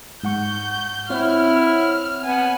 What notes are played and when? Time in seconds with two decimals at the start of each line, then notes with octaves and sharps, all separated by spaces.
0.23 G#2 F#5 C#6 G6
1.10 C4 E4 C#5 F#5 F6
2.24 B3 G#5